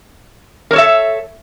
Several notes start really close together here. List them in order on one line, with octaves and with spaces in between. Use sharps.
A#4 C#5 A4 E5